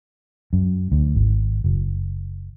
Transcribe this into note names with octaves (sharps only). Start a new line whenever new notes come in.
F#2
D2
G#1
F#1